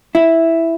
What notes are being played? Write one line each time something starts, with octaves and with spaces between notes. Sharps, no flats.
E4